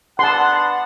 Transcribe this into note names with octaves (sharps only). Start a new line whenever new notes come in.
B3 D4 F#5 A5 C6